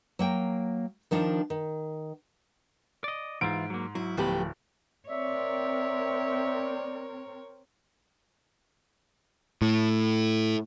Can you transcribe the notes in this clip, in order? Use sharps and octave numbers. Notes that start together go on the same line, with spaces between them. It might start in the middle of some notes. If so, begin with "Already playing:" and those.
F#3 A#3 G5
D#3 F3 D4 D#4
D#3
D5 D#5
G#2 E3 E4 F4 D7
F#3 A#3
F#3 E4
D1 F3 F#3 A3 B3 G4 B5
C4 A#4 C#5 D5 E5
A2